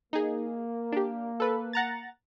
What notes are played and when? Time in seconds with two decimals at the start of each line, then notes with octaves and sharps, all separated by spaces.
0.13 A#3 D#4 G#4
0.92 D4 G4
1.40 A4 B4
1.73 F#5 A#5 A6